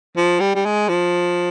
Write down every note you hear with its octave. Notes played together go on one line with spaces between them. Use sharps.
F3
G3
G3
G#3
F3